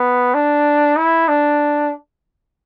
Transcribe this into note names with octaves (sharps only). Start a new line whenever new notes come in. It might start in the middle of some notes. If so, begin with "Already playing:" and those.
Already playing: B3
D4
E4
D4